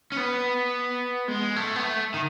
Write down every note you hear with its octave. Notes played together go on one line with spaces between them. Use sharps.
C#4
B3
G#3
A3
B3
A3
D#3